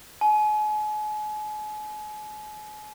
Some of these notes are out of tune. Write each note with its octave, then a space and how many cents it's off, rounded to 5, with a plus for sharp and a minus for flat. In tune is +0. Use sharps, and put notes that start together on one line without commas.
G#5 +40